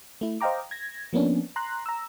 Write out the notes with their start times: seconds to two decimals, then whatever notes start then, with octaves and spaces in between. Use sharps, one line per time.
0.21 A3 E4
0.41 C5 D#5 F5 G5 A#5 D6
0.71 G#6 A#6
1.13 F3 A#3 B3 C#4 D4
1.56 A#5 C6 F#6
1.86 A#5 E6